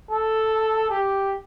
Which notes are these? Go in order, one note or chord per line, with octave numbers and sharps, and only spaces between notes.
A4
G4